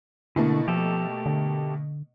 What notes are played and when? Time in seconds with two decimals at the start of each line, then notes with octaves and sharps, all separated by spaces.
0.36 B2 D3 A3 A#3 E4
0.68 F3 G4 A4
1.26 D3